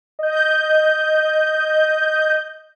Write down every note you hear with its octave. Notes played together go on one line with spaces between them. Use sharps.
D#5 G6